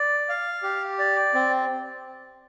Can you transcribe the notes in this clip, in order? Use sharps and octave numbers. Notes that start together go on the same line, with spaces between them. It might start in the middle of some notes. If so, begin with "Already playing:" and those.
Already playing: D5
F5
G4
D5
C4